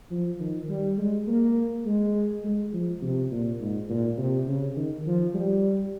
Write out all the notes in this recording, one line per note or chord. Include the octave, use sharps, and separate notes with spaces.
F3
D#3
G3
G#3
A#3
G#3
G#3
F3
C3
A#2
G#2
A#2
C3
C#3
D#3
F3
G3